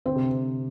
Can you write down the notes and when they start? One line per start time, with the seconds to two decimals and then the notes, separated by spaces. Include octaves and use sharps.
0.06 D3 C4
0.16 C3